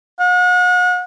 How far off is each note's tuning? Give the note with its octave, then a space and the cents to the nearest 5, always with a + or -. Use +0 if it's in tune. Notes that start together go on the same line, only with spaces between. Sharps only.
F#5 -40